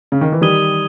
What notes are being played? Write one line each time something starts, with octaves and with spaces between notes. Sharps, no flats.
C#3
D#3
E3
D#3 G3 D#6 G#6 D#7 G7